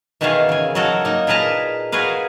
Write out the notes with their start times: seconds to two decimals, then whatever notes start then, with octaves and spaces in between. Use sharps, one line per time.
0.21 B2 D#3 E3 F#4 G#4 F5
0.49 C#3 G#5
0.75 F#3 D#4 F#4 A4 A#4
1.05 A#3 D#4
1.27 A#2 G#4 A#4 B4 A5 A#5
1.92 F#4 G#4 A#4 B4 F5